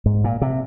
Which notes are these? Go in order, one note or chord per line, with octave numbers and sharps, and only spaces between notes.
G#2
A#2
C3